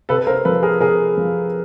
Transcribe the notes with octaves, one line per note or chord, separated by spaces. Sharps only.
C3 A4 B4
A#4 C5
F3 A4 B4
G#4 A#4
C3 G#4 A#4
F3